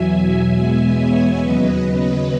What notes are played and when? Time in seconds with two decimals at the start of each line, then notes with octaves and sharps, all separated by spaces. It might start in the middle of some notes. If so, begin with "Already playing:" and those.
Already playing: E2 B2 F#3 E5 G#5
0.14 E5 G#5
0.56 E2 B2 G#3 B3 E5 G#5
0.98 C#5 E5
1.40 D#2 C#3 F#3 B3 B4 D#5
1.82 B4 D#5